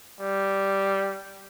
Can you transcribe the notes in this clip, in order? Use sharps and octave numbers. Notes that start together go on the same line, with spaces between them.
G3